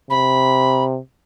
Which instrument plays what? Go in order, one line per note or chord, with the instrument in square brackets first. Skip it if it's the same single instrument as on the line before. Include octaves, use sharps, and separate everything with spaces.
[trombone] C3 [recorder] B5